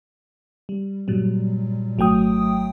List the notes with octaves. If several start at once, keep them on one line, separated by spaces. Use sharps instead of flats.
G3
G2 A#2 F#3 G3
G#1 F#3 A3 G5 D#6